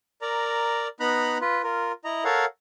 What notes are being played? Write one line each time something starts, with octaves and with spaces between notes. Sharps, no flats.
A#4 D5 A#5
B3 D#4 A#5 B5 F#6
F4 B4
F4 A#4
E4 D#5 A#5
A4 A#4 C#5 F5 F#5